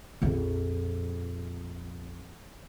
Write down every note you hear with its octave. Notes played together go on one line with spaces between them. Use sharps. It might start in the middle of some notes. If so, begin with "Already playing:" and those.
A#1 F2